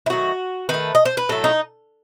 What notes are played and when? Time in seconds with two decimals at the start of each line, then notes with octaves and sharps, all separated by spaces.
0.06 E4
0.09 D#3 F#3 A3 F#4
0.69 D#3 A3 B4
0.95 D#5
1.05 C5
1.17 B4
1.29 A2 F#3 A3 A4
1.44 D#4